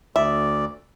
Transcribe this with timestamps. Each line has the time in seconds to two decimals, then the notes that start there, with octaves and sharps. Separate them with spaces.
0.16 D2 D5 E5